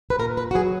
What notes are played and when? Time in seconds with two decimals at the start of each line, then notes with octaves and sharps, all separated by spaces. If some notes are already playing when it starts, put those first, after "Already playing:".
0.10 B4
0.19 A#2 A#4
0.37 B4
0.51 F#4
0.55 F#3 G#4